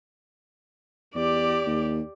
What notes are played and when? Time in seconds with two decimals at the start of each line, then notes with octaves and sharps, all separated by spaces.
1.15 E2 G4 D5
1.66 D#2